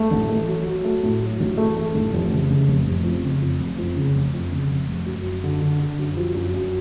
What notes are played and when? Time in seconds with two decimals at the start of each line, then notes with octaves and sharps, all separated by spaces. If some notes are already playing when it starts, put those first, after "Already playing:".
Already playing: A3
0.11 A1
0.29 A3
0.48 F#3
0.67 F#3
0.85 A3
1.03 A2
1.22 F#3
1.40 A1
1.58 A3
1.77 A3
1.95 A1
2.13 F1
2.32 C#3
2.50 C#3
2.68 F1
2.86 F1
3.04 F2
3.23 C#3
3.42 F2
3.60 F1
3.78 F2
3.96 C#3
4.16 F1
4.33 F2
4.52 C#3
4.71 F1
4.89 F1
5.06 F#2
5.24 F#2
5.44 D3
5.61 D3
5.80 D3
5.99 F#2
6.17 F3
6.35 F#2
6.54 F#2